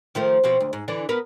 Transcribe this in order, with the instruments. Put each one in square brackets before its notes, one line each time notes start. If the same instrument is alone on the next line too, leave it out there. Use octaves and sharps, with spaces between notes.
[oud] D#3 F3 A3
B2 F3 C4
D2
G#2
D3 E3 D4
B3 A#4 B4